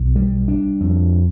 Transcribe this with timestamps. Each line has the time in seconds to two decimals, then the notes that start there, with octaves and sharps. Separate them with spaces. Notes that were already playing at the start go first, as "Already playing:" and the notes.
Already playing: B1
0.15 G3
0.48 D4
0.80 F2